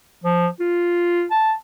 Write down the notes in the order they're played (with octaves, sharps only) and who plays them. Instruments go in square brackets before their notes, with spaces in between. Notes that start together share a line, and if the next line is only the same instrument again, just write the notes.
[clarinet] F3
F4
A5